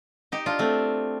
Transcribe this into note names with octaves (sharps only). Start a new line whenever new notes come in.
D#4 G4
D4 F4
A3 C4